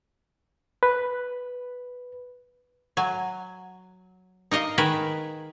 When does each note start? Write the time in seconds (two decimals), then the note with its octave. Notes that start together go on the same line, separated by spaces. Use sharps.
0.83 B4
2.97 F#3 G#5
4.51 D#4 A#4 D#5 F5
4.78 D#3 G#4 A#4 B4